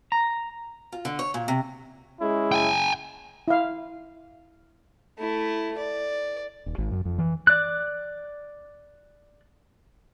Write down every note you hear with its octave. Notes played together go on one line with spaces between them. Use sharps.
A#5
F4
D3
C#5
A#2
C3
G#3 C#4 E4
G5 G#5
E4 F5
A3 E4
D5
D#1
G#1
F#2
F2
E3
D5 F#6